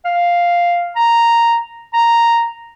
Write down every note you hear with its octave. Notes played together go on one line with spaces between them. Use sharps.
F5
A#5
A#5